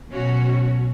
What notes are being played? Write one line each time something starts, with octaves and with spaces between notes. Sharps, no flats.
B2 F#3 C#4 F#4 C#5